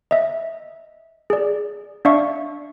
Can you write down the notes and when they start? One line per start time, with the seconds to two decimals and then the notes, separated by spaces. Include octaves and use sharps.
0.11 D#5 E5
1.30 G#4 D5
2.05 D4 D5 E5 F5 C#6